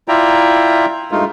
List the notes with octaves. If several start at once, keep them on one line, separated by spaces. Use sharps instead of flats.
E4 F4 D5 E5 G5 A#5
G2 G#3 A3 D#4 F4